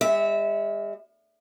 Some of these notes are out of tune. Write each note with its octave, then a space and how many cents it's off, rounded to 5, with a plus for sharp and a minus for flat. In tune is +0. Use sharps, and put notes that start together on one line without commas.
G#3 -45 E5 -15